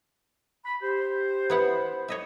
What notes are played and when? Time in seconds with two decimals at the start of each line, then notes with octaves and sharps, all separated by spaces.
0.66 B5
0.83 G4 C5
1.50 B3 E4 F#5
2.08 C#5 D#5 E5